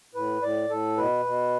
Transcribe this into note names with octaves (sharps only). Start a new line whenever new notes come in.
A2 B4
A2 D5
A2 A4
B2 B4
B2